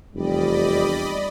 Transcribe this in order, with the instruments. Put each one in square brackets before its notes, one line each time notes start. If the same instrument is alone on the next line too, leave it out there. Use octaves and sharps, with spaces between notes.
[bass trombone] F1 [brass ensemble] E2 G3 [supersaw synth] D5 D#5 B5